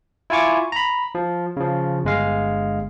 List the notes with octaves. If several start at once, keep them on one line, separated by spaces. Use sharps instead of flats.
E4 F4 G#5 C#6 D6
A#5 B5
F3
C#3 F3
G1 G#3 F5